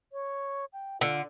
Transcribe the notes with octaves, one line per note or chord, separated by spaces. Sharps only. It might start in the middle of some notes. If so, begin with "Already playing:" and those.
C#5
G5
D3 F4